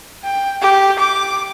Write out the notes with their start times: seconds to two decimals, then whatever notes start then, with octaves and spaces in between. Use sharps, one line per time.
0.24 G5
0.62 G4
0.99 D6